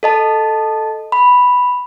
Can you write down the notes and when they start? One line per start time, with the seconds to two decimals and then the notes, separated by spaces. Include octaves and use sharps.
0.03 A4 D#5 A5
1.12 B5